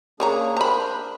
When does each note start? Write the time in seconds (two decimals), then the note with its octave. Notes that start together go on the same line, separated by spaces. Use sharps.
0.20 C#3 A#3 D4 G#4 C#5 A#5
0.57 D4 A#4 C5 A#5 B5